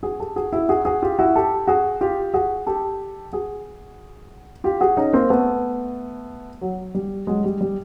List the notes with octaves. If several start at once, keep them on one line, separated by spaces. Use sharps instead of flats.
F#4 G#4
G4 A4
F#4 G#4
E4 F#4
F#4 G#4
F#4 G#4
F4 G4
E4 F#4
G4 A4
F#4 G#4
F4 G4
F#4 G#4
G4 A4
F#4 G#4
F4 G4
F#4 G#4
C#4 D#4
A#3 C4
A3 B3
F#3
G3
F#3 G#3
G3
G3